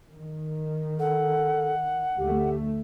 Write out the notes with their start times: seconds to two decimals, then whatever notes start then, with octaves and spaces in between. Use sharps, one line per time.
0.15 D#3
0.99 A4 F#5
2.18 D2 A3 G4